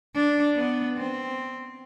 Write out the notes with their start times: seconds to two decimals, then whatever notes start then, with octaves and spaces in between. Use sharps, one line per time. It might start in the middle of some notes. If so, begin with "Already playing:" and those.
0.15 D4
0.55 B3
0.97 C4